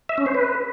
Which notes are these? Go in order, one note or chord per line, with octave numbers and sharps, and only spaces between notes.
E5
C#4
C5
B4